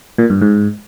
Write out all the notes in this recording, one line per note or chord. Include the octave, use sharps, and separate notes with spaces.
A#2
G2
G#2